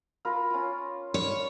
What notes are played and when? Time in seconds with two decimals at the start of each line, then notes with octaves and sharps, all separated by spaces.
0.25 F4 A#4 B5
0.50 C#4 F4
1.14 C#5